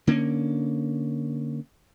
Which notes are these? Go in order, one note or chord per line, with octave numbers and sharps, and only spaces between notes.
D3 A#3 C4 C#4